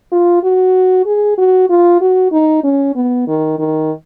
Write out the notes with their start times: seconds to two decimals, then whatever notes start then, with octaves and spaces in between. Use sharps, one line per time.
0.12 F4
0.43 F#4
1.06 G#4
1.38 F#4
1.70 F4
2.01 F#4
2.32 D#4
2.64 C#4
2.95 B3
3.27 D#3
3.59 D#3